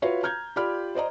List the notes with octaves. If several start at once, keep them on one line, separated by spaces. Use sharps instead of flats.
F4 F#4 B4 C#5 E5 F5
A#5 F6 G6 G#6
F4 G4 D5 B5 F6
C5 D5 D#5 A#5